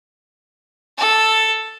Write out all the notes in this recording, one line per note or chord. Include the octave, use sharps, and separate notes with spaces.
A4